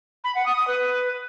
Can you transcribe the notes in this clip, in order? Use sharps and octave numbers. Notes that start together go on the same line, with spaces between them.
B5
F#5
D#6
D#6
B4